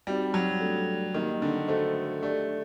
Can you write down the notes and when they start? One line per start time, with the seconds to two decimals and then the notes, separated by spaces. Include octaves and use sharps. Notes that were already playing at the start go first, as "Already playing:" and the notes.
0.07 G3 C4 D#4 F#4
0.34 F#3
0.61 A3 D4 A4
1.14 D#3 A#3 D#4 G4
1.42 D3
1.68 A3 F#4 A4 C5 D#5
2.23 A3 D4 G4 D5